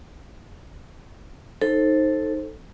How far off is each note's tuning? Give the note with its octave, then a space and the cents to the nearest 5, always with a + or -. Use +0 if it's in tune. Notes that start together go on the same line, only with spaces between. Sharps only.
D#4 +0 A4 +0 C5 +20